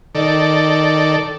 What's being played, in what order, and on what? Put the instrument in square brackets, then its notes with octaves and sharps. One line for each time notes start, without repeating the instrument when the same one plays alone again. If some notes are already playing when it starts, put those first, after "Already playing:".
[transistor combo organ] D#3 A4 D5